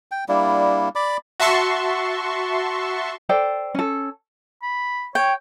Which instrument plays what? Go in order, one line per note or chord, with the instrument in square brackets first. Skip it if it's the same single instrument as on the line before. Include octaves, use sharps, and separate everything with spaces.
[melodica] G5
G3 A#3 D4 E4
D5 B5 D6
[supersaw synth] F#4 E5 A5 C6 C#6
[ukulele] A4 C5 D5 G5
C#4 A4
[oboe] B5
[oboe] C#5 [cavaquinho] G5